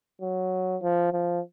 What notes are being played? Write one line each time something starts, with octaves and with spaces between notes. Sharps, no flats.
F#3
F3
F3